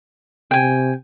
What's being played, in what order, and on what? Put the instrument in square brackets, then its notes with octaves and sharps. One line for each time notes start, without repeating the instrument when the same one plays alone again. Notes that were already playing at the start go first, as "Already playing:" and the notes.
[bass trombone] C3 [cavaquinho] G5 G#5